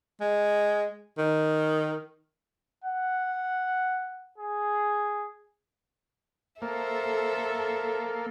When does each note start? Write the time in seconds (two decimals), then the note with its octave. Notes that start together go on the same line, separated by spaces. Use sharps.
0.21 G#3
1.18 D#3
2.84 F#5
4.38 G#4
6.62 A#3 A4 C5 E5